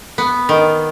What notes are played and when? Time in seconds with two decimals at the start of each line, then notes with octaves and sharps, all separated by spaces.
0.18 B3
0.49 D#3